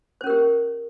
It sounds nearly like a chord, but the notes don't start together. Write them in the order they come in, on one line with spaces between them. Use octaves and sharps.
C5 C#4 A#4 G4